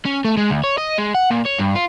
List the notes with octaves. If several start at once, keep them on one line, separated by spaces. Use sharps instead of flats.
C#4
A3
G#3
D2
C#5
D#5
G#3
F#5
A#2
C#5
G2
F4